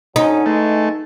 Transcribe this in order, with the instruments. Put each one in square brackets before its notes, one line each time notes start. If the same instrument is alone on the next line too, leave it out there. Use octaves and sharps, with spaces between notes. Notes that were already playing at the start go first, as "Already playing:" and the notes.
[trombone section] D3 F#3 C#4 [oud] D#4
[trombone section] G#2 E3 G#3 [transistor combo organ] A3